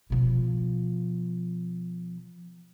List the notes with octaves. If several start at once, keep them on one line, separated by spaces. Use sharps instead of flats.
B2 F3